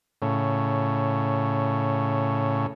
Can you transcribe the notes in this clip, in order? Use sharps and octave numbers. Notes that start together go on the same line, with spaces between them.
A2 C#3